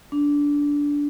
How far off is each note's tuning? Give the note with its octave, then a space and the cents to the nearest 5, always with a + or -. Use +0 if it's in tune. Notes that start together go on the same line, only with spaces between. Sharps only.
D4 -15